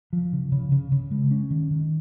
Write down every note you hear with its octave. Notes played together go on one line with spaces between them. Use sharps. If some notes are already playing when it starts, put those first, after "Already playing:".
F3
C#3
C#3
C#3
C#3
G#3
C#4
D#3
D#3